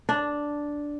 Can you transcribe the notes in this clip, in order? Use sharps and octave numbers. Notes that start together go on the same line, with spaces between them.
D4